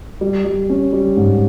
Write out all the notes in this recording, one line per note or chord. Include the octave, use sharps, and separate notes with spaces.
G3
G3
C#4
G3
G#2